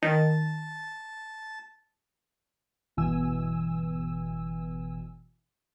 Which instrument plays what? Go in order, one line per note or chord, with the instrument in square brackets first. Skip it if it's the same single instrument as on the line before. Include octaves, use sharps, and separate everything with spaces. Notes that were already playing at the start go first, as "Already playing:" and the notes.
[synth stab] D#3 [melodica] A5
[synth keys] G1 B2 E3 G#5 E6